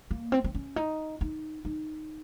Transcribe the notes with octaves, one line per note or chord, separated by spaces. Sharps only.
A#3
C4
C4
C#4
D#4
D#4
D#4